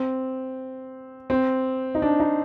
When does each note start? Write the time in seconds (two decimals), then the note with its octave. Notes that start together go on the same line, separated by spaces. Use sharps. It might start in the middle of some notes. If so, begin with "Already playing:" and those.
Already playing: C4
1.30 C4
1.95 D#4
2.02 D4
2.20 D#4